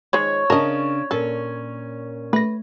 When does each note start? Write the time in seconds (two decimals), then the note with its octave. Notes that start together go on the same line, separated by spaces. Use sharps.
0.13 D#3 G#3 C#5
0.50 C#3 C#4 D4 A#4 D#5 A5
1.11 A#2 C#4 A4
2.33 A3 B4 A#6